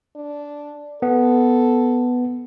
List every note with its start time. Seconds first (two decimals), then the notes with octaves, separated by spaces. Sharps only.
0.16 D4
1.02 B3 A4